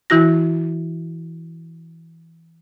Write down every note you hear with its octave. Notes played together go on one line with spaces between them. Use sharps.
E3 E4 F#4 A#6